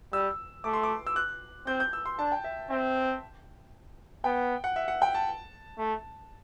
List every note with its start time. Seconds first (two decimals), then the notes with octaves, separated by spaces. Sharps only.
0.13 G3 E6
0.64 A3 D6
0.73 C6
0.83 D6
1.07 E6
1.16 F#6
1.67 C4 G6
1.80 G6
1.93 E6
2.06 C6
2.19 D4 A5
2.32 G5
2.44 E5
2.70 C4 E5
4.24 B3 G5
4.64 F#5
4.76 E5
4.88 F#5
5.02 G5
5.15 A5
5.78 A3